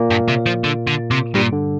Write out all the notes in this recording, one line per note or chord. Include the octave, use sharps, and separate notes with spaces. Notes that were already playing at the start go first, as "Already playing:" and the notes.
Already playing: A#2 A#3
G2
C3
F3
D3
D3
C3
G2 A#2 G3
D3